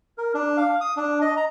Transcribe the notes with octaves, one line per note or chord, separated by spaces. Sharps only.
A#4
D4
F5
D#6
D4
D#5
A#5